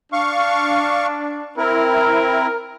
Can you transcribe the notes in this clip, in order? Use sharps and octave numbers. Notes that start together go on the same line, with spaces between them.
D4 F5 C#6
C4 E4 A#4